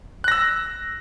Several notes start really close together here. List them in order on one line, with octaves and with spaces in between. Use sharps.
F#6 A#6 E6